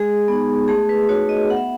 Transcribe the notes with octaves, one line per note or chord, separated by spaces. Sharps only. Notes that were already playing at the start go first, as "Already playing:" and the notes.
Already playing: G#3 G#4
B3 D#4
A3 G#4
B4
D#4 F#4 C#5
D#5
B3 F#5
E5